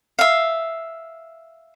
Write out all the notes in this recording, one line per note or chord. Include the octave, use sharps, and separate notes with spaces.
E5 F5